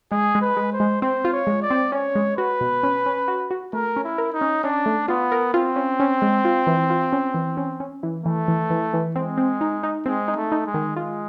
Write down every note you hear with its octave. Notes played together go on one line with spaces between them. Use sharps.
G#3 G#4
G#3
B4
G#3
C5
G#3
C4 C5
F4
C#5
G#3
D5
C4
C#4 C#5
G#3
F#4 B4
B2
C#4
C#4
F#4
F#4
A3 A#4
C#4
E4
A#4
D#4
C#4
C#4 D4
A3
B3 F4
A#4
C4 F4
C#4
C#4
G#3
F4
E3
F4
C#4
E3
C#4
C#4
E3
E3 A3
E3
E3
E3
G#3 C4
C4
D#4
D#4
G#3 C4
D#4
A3
D#4
G#3
D#3
G#3 F4